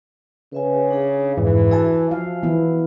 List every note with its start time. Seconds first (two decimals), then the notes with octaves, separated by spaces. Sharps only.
0.53 C#3 B4 E5 G#5
0.91 D4 G#4
1.37 F2 G#2 E3
1.71 F#4 E5 G#5 A5
2.11 F3 F5
2.43 E3 B3 E4